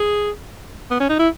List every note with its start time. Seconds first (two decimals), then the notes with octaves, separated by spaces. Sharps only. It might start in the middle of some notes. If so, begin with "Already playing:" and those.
Already playing: G#4
0.91 B3
1.00 C#4
1.09 D#4
1.19 E4